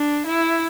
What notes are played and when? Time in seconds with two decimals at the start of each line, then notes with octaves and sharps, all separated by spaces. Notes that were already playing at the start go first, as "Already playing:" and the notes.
Already playing: D4
0.26 E4